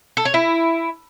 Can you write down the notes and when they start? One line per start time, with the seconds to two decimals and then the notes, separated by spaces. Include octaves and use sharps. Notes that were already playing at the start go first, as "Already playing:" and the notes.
0.17 A4
0.25 C#5
0.34 E4